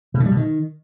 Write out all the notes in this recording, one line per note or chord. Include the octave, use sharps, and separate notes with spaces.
B2
C#3
G3
B2
D#3